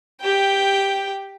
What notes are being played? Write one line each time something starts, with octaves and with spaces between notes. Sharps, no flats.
G4 G5